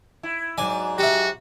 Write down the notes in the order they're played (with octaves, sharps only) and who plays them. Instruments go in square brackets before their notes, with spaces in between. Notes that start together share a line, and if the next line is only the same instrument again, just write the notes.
[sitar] E4
[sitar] G#2 F#3 [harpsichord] D5 G#5
[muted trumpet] F#4 [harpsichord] G4 E5